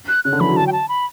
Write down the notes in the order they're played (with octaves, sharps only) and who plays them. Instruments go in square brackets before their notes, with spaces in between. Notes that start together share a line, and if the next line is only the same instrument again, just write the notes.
[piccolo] F#6
[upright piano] C#3 [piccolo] F#6
[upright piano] D3
[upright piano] E3 [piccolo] B5
[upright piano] F#3
[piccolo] A5
G5
A5
B5